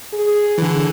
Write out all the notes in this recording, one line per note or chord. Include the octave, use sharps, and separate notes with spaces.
G#4
D3 E3